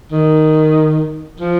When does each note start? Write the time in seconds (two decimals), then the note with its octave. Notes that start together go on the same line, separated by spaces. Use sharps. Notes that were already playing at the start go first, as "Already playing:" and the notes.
0.12 D#3
1.40 F3